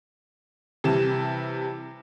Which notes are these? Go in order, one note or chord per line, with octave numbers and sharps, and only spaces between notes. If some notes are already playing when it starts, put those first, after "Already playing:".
C3 E3 G3 A5 E7